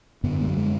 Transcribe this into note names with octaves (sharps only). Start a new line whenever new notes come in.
F#2 D3 B3
G#3
F#3
G#3